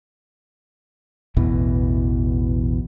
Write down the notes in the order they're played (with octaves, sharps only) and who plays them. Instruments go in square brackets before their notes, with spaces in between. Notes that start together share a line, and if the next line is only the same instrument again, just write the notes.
[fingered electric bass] A1 E2 B2 E3